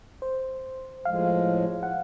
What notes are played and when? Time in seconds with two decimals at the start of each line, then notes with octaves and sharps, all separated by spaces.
0.22 C5
1.05 A2 F3 G#3 F5
1.83 F#5